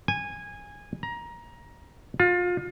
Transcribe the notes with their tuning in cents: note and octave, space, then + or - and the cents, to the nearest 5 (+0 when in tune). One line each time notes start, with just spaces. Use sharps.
G#5 -15
A#5 +20
F4 +30